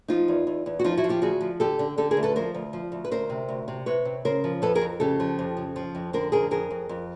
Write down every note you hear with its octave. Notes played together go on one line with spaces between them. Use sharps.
F3 D#4 F4
E2
E2
E2
F#4
F3 D#4 F4
E4 F#4
F3
F4 G4
D2 F#4 G#4
F3
D3 G4 A4
D3
D3 G4 A4
G#4 A#4
D2
A4 B4
F3 A#4 C5
D2
F3
D2
B4
D2 A#4 C5
C3
D2
C3
C3 B4 C#5
C3
C#3 A#4 C5
F3
F2 A4 B4
G#4 A#4
F2
C#3 G4 A4
F3
F2
C#3
F3
F2
D3 A#4 C5
F2 G#4 A#4
F2 G#4 A#4
F2
F2